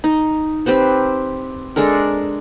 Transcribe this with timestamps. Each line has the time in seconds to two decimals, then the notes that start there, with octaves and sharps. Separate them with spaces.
0.04 D#4
0.66 C4 G4 B4 C5
1.76 G#3 D4 A4 A#4